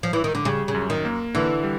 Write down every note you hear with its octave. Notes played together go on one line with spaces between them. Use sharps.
F3
E3
D#3
D3
C#3 G3
C#3
F#2
D#3
A#3
D3 E3
G3